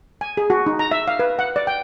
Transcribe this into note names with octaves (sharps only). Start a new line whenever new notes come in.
G#5
G#4
F#4
D#4
A#5
E5
F5
B4
F#5
D5
G5